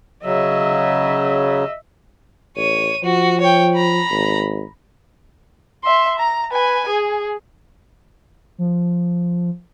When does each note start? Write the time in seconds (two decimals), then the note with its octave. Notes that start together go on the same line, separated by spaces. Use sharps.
0.24 C#3 F#3 D#5 E5
2.57 A1 C#5 D#7
3.04 F3 F#4
3.41 C#5 G5
3.75 A#5 B5
4.11 G#1
5.84 E5 C6
6.19 A#5
6.53 B4 G#5
6.89 G#4
8.58 F3